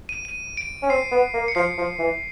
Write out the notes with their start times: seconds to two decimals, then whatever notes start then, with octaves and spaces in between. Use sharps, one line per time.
0.09 D#7
0.25 D#7
0.57 D7
0.83 C#4
0.90 C4 C7
1.12 B3
1.34 A#3
1.48 C#7
1.55 F3 C7
1.78 F3
1.99 E3